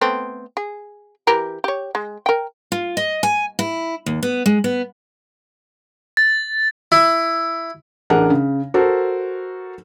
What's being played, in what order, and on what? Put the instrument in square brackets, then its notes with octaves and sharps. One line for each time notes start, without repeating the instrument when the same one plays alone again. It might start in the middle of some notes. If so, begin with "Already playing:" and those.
[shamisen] A3 B3 C4
G#4
E3 G4 A#4
G4 C#5
G#3
A#4 G5
[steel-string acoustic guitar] F4
D#5
G#5
E4
D#2
B3
G#3
B3
[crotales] A6
[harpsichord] E4
[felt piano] A1 D4 G#4 A#4 F#5
C#3
F#4 A4 A#4 C5